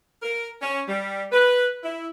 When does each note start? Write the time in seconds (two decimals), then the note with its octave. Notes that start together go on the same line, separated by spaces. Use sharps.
0.23 A#4
0.62 C#4
0.88 G3
1.32 B4
1.84 E4